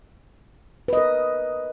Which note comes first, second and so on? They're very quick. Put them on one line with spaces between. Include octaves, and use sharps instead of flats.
B4 D#5 A#4